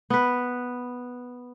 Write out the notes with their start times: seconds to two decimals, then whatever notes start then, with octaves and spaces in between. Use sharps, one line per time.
0.10 B3 B4